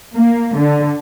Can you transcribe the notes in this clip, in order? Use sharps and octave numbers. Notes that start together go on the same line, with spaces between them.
A#3
D3